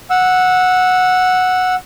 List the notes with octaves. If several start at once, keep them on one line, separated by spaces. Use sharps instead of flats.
F#5 E6